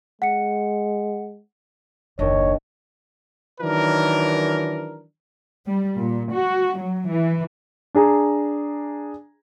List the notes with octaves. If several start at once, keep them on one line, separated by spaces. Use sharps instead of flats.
G#3 F#5 C#7
F#1 D#2 D4 C#5 D#5
D#3 E3 F#3 D4 A#4
G3
A#2
F#4
F#3
E3
D4 G#4 A#5